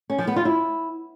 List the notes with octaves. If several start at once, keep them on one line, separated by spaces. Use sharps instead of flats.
C#4
F3
B3
F4
E4